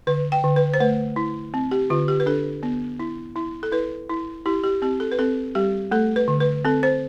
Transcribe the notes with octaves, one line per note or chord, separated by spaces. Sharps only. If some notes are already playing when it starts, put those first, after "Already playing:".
D3 B4
G5
D3
B4
C5
A3 B4
E4
C4
G4
D3 F4
G4
B4
D4 A4
B3
E4
E4
A4
E4 B4
E4
E4 G4
G4
C4 G4
A4
B4
C4 A4
G3 G4
A3 A4
B4
D3
B4
C4 A4
C5